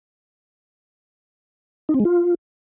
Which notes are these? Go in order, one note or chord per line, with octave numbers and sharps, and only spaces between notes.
D#4
C4
G#3
F4